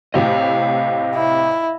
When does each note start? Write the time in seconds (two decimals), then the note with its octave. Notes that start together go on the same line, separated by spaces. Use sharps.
0.14 A2 C3 D#5 F5
1.15 E4